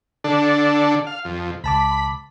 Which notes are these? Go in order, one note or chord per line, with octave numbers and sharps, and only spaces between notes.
D3 D4 A4
F5
F2
C#2 A5 B5 D6